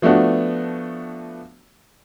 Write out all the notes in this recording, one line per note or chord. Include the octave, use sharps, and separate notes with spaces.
F3 A3 B3 D4 F#4